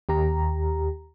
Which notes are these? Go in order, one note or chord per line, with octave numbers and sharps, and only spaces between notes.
D#2 G4 A#5